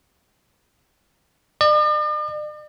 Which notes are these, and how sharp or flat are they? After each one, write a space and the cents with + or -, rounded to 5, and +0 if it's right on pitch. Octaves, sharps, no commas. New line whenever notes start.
D5 +45